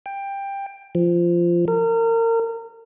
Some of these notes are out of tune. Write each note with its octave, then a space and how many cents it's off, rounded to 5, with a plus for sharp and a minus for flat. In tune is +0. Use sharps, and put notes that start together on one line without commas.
G5 +15
F3 -15
A#4 -30